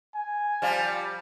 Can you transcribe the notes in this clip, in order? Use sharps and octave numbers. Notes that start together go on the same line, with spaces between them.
G#5
F3 G3 F4